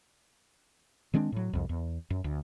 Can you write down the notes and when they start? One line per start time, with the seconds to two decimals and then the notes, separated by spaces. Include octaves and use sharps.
1.14 D#3 G#3 C4 D4
1.32 A2 F#3
1.53 C2 F2
1.69 E2
2.10 F#2
2.24 D2